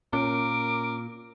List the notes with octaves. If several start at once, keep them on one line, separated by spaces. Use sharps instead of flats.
A#2 C#4 A#4 D6